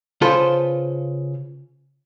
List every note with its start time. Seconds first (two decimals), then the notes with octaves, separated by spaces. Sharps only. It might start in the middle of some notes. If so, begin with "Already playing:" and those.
0.21 C#3 F4 A4 B4 C5